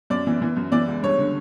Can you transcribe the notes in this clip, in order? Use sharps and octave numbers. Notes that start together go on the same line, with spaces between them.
F#2 D5
E3
E3
F#2
E3 D5
C#2
G2 C#5
D3